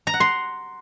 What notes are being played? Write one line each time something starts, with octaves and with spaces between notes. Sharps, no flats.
A#5
F#5
C6